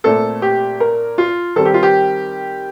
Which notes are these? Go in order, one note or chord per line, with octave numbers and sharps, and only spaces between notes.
A#2 A3 C4 A4
G4
A#4
F4
D#3 G3 C4 A4
G4
F4
G4